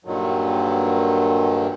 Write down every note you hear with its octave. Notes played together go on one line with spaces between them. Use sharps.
G2 A#2 D3 D#3 F#3